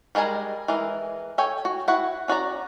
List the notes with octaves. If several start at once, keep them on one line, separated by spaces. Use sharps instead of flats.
G3 G#3 A#4 G#5 A#5
E3 G#3 A#4
A4 C#5 G5 G#5
F#4
E4 F#4 F#5
C#4 F#4 D5 A#5